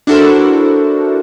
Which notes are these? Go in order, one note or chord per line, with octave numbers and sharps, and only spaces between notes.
D4 E4 F#4 A4 A#4 C5